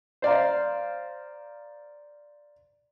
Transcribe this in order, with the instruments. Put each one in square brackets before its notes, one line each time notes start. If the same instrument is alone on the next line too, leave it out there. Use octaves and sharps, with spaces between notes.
[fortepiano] C5 D5 F5 A#5